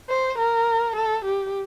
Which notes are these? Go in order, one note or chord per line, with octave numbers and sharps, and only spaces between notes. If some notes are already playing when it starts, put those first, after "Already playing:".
C5
A#4
A4
G4